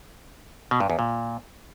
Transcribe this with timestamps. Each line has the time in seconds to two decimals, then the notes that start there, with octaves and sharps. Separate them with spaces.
0.71 B2
0.80 G2
0.90 E2
0.99 A#2